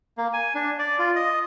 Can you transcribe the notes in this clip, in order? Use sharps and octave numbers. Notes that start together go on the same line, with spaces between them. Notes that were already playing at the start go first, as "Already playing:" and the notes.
A#3
G#5
D4
D5
F4
D#5